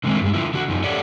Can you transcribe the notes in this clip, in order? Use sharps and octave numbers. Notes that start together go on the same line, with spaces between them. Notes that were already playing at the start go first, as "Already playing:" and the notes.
D3 D#3 G#3 A3 C4
G2 G#3
D3 F3 A#3 E4
D3 F#4
F#2 F3 D#4
G4 A4 C#5 D5 E5 F#5